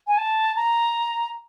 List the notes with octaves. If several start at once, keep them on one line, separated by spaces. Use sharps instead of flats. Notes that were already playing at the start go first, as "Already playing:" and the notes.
G#5
A5
A#5